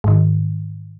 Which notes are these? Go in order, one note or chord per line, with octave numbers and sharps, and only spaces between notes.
G#2 D#3